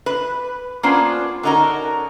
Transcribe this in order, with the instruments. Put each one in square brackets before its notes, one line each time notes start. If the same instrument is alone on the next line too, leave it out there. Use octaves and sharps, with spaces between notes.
[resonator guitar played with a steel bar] B4
A#3 B3 C#4 D4 F4 C5
D3 C#4 D#4 F#4 A#4